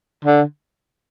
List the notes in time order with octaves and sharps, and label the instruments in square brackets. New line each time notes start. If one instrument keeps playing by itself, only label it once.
[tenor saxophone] D3